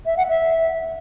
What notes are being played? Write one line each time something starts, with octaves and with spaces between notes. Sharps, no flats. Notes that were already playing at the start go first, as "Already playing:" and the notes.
E5
F#5
E5